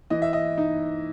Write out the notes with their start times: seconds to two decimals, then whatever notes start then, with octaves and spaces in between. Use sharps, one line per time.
0.10 E3 D#5
0.22 E5
0.33 D#5
0.58 D#4